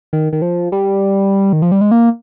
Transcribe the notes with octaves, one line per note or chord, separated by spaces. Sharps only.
D#3
D#3
F3
G3
D#3
F3
G3
G#3
A#3